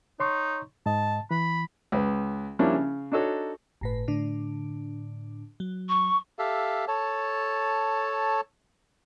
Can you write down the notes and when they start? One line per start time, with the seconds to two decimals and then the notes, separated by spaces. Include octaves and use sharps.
0.20 D#4 C#5 C6 C#6
0.86 G#2 D#5 A5
1.31 E3 B5
1.92 C#2 B4
2.59 F3 G3 A#3 C#4 D4 E4
2.73 C#3
3.12 D4 D#4 F#4 A4 C#5
3.81 G1 A2 B4
4.08 A2 D3 D4
5.60 F#3
5.89 C#6
6.39 G4 A4 E5 F5
6.88 A4 C#5 A5